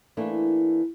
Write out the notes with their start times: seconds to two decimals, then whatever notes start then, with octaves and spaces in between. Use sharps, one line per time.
0.17 E3 A3 A#3 D4 E4